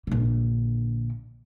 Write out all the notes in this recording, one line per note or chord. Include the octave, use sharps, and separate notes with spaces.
A#1 D3